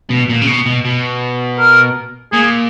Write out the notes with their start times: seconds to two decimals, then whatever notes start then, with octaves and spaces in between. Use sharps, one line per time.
0.10 B2
0.29 A#2
0.42 C#3
0.47 B2
0.66 B2
0.85 B2
1.59 A#4
2.32 A#2 G#4